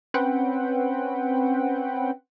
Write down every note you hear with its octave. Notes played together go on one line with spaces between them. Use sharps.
C4 C#4 B4 F#5 G5